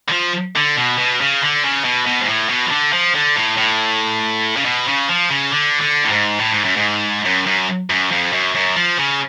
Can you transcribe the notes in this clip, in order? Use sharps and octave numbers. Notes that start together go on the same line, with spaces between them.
D3
F3
D3
B2
B2
C#3
D3
C#3
B2
B2
G#2
A2
B2
F3
D3
F3
D3
A2
A2
C#3
B2
C#3
F3
C#3
D3
D3
A2
G#2
A2
G#2
F#2
G#2
F#2
F#2
F#2
F2
F#2
F#2
F3
C#3